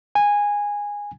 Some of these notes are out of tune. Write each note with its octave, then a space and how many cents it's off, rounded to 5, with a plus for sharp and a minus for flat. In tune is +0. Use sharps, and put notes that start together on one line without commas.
G#5 -15